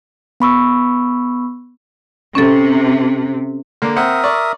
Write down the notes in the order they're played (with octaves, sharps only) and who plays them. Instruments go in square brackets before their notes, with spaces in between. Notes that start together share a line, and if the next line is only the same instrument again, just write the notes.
[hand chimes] B3 B5 C#6 E6
[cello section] C3 [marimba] C#4 A4
[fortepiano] D3 A#3
[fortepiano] C4 F#5 [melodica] A#4 E5 D#6
[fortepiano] D5 C#6